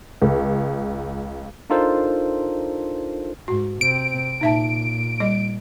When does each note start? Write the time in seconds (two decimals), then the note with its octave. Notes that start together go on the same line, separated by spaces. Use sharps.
0.22 C#2
1.70 D4 D#4 F4 A4 A#4 C5
3.48 G#2 F#4
3.81 C3 C4 D7
4.41 A#2 D#4 E5 A5
5.20 G3 D#5